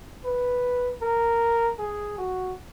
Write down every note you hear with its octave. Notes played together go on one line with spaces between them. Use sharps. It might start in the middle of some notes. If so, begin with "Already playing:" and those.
B4
A#4
G#4
F#4